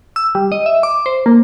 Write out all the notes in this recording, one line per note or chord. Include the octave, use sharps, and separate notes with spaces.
E6
G3
D#5
E5
D6
C5
A#3